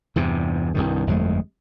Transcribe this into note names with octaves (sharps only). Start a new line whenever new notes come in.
E2 G2 C3
C2 G2 D#3
G1 F2 G#3 A3